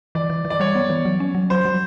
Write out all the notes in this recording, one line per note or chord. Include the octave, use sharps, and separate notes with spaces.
E3 D5
E3
E3
D5
G3 C#5
B3
E3
F#3
C#4
F#3
F#3 C5
F#3